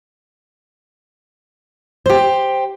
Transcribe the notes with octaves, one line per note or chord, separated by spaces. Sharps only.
G4 C5